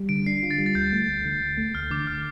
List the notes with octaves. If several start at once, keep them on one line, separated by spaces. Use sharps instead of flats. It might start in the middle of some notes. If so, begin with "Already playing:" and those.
Already playing: G3
D3 D7
D4 C7
F4
A6
G3
A6
D2 G6
A3
D2
D3
D2
A3
D2 F6
D3 D6
F6